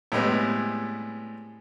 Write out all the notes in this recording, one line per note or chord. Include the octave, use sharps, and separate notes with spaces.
A2 G3 G#3 B3 C4